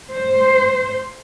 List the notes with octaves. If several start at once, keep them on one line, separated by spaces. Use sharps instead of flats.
C5